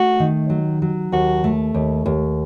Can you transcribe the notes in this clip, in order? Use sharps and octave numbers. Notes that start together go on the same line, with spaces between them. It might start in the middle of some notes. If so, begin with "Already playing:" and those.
Already playing: A3 F#4
D#3
F#3
F#3
D#2 F#4
A3
D#2
D#2